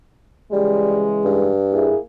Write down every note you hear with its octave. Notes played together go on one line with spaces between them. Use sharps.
C#3 E3 G3 G#3
G2
A#3 E4 G#4